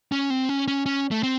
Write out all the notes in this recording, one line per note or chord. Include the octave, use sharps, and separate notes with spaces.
C#4
C4
C#4
C#4
C#4
A3
C4